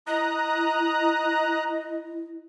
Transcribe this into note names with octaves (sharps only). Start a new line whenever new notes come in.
E4 D#5 A#5 D#6 F#6